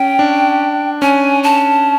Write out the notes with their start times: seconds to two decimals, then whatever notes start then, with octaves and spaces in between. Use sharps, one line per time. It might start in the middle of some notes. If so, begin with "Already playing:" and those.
Already playing: C#4 G5
0.19 D4
1.02 C#4 G#5
1.43 A5